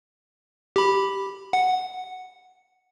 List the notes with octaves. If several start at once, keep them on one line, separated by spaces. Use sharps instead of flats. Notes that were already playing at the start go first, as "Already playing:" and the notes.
G4 B5
F#5